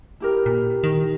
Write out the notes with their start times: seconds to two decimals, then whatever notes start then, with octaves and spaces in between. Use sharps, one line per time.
0.20 E4 G4 A#4
0.46 A#2
0.84 D#3